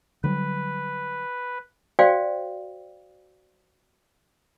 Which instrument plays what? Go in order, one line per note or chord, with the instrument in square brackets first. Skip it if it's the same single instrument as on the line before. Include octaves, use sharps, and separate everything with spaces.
[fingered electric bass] D3 F#3 G3 [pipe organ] B4
[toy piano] F#4 C5 D5 F5 G5